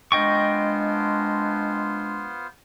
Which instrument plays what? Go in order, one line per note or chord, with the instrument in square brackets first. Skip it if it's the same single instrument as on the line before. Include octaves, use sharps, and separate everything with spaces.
[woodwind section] G#3 D4 [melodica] B3 F4 C5 [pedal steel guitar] D#5 G5 C#6